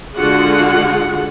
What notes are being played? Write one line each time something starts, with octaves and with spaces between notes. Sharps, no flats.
D3 G#3 F4 F#4 G#4 F#5